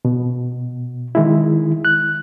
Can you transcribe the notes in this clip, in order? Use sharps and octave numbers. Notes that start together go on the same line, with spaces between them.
B2
D#3 G#3 E4
F#6